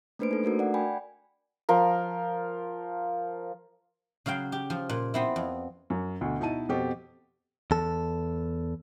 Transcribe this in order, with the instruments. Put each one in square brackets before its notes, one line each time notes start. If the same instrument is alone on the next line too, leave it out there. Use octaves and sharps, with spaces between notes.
[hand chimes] A3 A#3 D4 B4 C5 D7
D#4 A4
A3 D4 F#4 A#4
D5 F#5
G5 G#5 B5
[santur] F3 A#4
[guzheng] C#3 F#3 F5 G5
G4
F3
A#2
B3 C4 E4
F2
[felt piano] F#2
D2 B2
B2 D#4 E4 A5 D#7
F2 B2 G4 A4 C5
[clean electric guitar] E2 A4